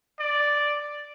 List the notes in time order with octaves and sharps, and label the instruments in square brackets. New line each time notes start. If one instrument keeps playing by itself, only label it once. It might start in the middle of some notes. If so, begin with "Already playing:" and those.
[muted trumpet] D5